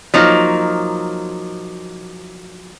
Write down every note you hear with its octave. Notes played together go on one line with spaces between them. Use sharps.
F3 F#3 A#3 D#4